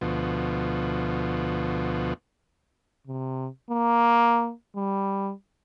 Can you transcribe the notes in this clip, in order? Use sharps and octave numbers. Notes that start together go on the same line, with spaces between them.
D2 B2 F3
C3
A#3
G3